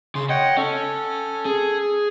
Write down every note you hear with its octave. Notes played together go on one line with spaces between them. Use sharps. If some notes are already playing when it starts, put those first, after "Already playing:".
C#3 C6
C#5 D#5 F#5 G5
C#4 A4
G#4